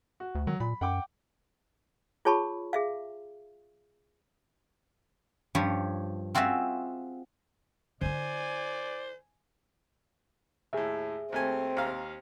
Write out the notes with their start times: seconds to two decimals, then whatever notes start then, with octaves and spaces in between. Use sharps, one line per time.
0.20 F#4
0.35 D2
0.47 D#3 F#3
0.60 A#2 B5
0.81 F#2 F#5 G5 D6
2.25 F4 G#4 C#5 A5 B5 C#6
2.73 G#4 E5 F5
5.55 G2 F3 G4 C#5
6.35 C4 F4 F#4 G#4 E5
8.02 D3 E4 C5 D5 G#5
10.73 D#2 A2 G#4 E5
11.32 D#2 A3 C4 G#5
11.77 D#2 F5 A#5